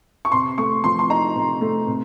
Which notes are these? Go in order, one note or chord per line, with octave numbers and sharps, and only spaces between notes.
C#6
C3 C6
A3 C#6
F3 C6
C6
D#4 A#5
C3
A3
C3